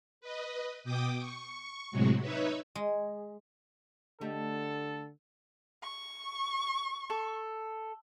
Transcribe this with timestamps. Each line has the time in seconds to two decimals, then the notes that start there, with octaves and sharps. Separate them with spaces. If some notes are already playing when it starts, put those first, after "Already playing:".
0.21 B4 D#5
0.84 B2 G5 D6 D#6
1.19 C#6
1.91 A2 C3 F#3 G#3 F#4
2.21 D#4 B4 C#5 E5
2.75 G#3
4.21 D3 A3 G4 A4 D#5
5.82 C#6
7.10 A4